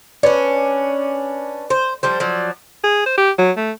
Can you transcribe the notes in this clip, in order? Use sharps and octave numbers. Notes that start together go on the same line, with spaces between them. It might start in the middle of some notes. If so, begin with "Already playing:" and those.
C#4 D4 B4 D5
C5
F3 G3 C5
F3 F#3 D5
G#4
C5
G4
F#3
A3